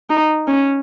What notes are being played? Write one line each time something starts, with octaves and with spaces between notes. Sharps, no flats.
D#4
C#4